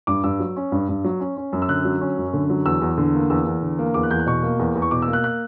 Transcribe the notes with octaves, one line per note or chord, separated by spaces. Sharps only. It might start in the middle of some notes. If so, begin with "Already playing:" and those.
G2 D6
G2 E6
F#3
C#4
G2
G2
F#3
C#4
C#4
F#2
E6
D3 F#6
F#3
C#4
F#2
D3
F#3
E2 E6
E2
D3
A#3
E2 E6
E2
D3
A#3
E2 D6
F#6
E2 G6
F#6
B2 C#6
A#3
E2
E2
C#6
B2 D6
E6
A#3
F#6
F#6